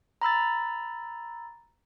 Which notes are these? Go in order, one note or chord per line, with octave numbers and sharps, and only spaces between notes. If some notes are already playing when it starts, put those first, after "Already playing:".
A#5 B5 E6 A6